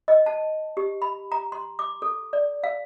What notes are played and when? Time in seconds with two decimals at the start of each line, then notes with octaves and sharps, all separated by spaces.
0.08 D#5
0.26 A5
0.77 G4
1.02 B5
1.32 A#5
1.52 C6
1.79 D6
2.02 A4
2.33 D5
2.64 F5